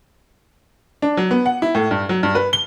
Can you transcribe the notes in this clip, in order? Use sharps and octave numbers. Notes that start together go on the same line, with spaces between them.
D4
F#3
B3
F#5
E4
A2
G2
F#3
G2
B4
G7